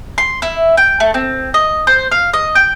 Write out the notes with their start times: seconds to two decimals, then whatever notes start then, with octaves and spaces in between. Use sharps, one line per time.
0.18 C6
0.42 E4
0.77 G5
1.00 A3
1.14 C4
1.54 D#5
1.87 C5
2.12 F5
2.33 D#5
2.55 G5